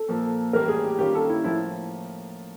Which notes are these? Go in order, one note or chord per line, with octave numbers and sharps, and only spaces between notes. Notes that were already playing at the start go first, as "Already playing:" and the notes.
Already playing: A4
A#2 F3 A#3
A2 E3 G3 A#3 A#4
G#4
G4
D#3 G3 A#3 C#4 F4 G4
A4
E4
A2 F3 A#3 E4